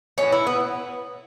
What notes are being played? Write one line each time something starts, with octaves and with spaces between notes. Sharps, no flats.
A2 E3 G3 C#4
E4
B3